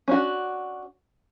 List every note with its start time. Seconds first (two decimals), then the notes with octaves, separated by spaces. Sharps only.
0.08 C#4 D4 F#4